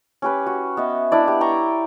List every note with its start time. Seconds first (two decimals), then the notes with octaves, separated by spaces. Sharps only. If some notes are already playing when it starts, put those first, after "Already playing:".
0.22 C#4 G4 B4
0.46 F#4
0.77 B3 D#5 E5
1.11 D4 E4 D5 D#5
1.28 G4
1.40 D5 G5 A#5 C#6